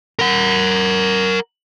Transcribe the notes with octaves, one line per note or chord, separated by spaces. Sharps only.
A#4 F#5